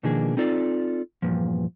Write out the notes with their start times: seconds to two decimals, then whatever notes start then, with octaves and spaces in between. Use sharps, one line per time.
0.03 B2 D#3 F3 A#3 D4 G#4
0.37 C4 D#4 F4 A4 D5
1.22 E2 G2 A#2 F3